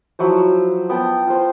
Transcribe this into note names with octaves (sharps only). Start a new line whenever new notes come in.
F3 F#3 E4 C5
B3 G5 A5
F4 C5